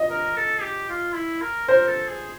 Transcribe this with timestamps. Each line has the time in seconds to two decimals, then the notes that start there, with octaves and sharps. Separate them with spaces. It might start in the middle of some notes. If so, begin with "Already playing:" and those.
Already playing: D#5
0.10 A#4
0.36 A4
0.62 G4
0.89 F4
1.15 E4
1.42 A#4
1.68 A#4 C5
1.87 A4
2.08 G#4